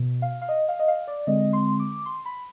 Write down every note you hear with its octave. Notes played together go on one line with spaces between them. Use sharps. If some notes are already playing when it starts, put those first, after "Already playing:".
Already playing: B2
F5
F5
D#5
F5
D#5
F5
D5
D3 G#3 C4 D#5
C6
D6
C6
B5